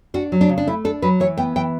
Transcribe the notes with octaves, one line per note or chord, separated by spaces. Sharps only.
D4 F#4
F#3
D4
C#3
D4
A3 E4
D4 A4
F#3 B4
E3 C#5
B3 G5
E3 G5